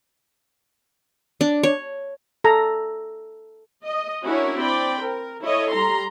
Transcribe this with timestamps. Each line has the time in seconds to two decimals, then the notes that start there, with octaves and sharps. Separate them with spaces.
1.41 D4
1.63 C#5
2.44 A4 A#5
3.85 D#5
4.24 C#4 D4 E4 F#4 A#4 C#5
4.57 C4 D5 G5 B5
4.99 A#4
5.41 E4 A4 C#5 D#5
5.72 G3 A#5 C6